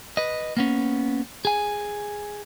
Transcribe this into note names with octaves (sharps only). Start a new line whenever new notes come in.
B4 D#5
A#3 B3 C#4
G#4 G#5